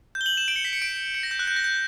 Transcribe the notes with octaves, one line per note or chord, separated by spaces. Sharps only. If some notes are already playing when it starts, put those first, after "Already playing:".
G6
G7
F#7
E7
D7
C#7
B6
C#7
D7
C#7
A#6
G6
F#6
G6
A#6
G6